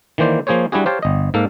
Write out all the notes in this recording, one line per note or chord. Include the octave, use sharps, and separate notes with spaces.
D#3 E3 A#3 C5 D5
F3 A#3 G#4 C5 C#5
G3 D4 E4 F#4 G#4
G4 C5 C#5 F5 G5 A5
G1 D#5
G#2 A#3 A4 F5